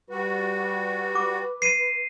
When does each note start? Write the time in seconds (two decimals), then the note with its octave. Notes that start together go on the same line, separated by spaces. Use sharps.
0.10 G3 F#4 B4
1.15 D6
1.62 C7 D#7